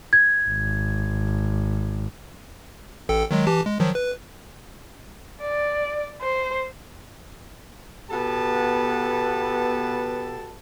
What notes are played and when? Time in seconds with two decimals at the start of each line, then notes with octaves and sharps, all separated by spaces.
0.13 G#6
0.47 G#1
3.09 A1 A4 G5
3.31 D#3 F#3 G#3
3.47 E3 G4 A5
3.66 G#3
3.80 D#3 F3 F#3
3.95 B4
5.41 D5
6.22 C5
8.10 B2 B3 G4 A4 B4 A5